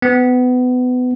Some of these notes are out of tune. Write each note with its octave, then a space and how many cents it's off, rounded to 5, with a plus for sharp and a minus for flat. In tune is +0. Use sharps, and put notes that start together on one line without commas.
B3 +25